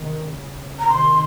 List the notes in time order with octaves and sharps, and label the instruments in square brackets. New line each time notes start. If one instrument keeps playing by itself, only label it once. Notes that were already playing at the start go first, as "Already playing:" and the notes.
Already playing: [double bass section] C3 D#3
A#2 C#3
[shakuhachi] A#5
[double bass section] C3 D#3 [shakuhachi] C6